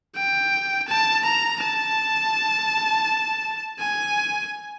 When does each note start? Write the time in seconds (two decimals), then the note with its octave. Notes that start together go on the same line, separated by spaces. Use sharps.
0.16 G5
0.88 A5
1.25 A#5
1.62 A5
3.80 G#5